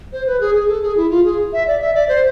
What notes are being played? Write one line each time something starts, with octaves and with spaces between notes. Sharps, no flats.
C5
B4
G#4
G#4
A4
G#4
E4
F4
G#4
E5
D5
E5
D5
C5